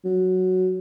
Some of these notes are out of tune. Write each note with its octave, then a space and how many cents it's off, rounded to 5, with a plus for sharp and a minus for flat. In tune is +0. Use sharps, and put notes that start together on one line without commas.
F#3 +0